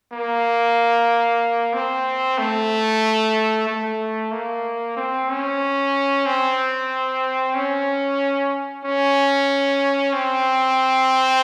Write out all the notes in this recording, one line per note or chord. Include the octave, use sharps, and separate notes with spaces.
A#3
C4
A3
A3
A#3
C4
C#4
C4
C#4
C#4
C4